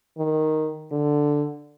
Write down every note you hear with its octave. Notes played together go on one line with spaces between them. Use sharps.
D#3
D3